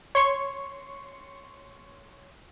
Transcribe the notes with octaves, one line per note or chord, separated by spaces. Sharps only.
C#5 C6 C#6